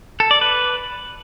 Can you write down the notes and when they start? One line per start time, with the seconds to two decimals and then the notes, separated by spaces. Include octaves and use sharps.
0.20 A4
0.31 D5
0.41 B4